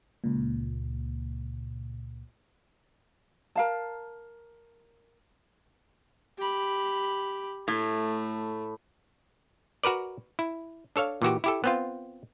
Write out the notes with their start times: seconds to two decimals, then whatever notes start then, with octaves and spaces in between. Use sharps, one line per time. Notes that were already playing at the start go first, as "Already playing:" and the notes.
0.24 C#2 A#2
3.56 A#4 F5 A5
6.38 G4 B5
7.68 A2 A3
9.84 F#4 A#4 B4 D5
10.39 E4
10.96 D4 A4 C#5 F5
11.22 A#2 E3 F#4 G4
11.44 E4 G4 A4
11.64 B3 C4 F4